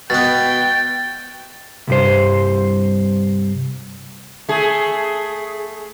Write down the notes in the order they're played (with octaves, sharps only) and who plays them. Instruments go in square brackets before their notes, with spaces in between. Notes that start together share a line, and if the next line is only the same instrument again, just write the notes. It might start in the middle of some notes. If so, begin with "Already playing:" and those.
[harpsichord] B2 B3 [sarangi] G5 [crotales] A6
[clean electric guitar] C2 G2 C5
[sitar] A3 G#4